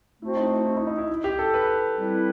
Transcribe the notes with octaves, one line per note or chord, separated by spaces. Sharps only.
A3 C4 E4 F#4 C5
D#4
E4
E4
D#4
D#4
E4
G4
A4
B4
G3 C4 E4 B4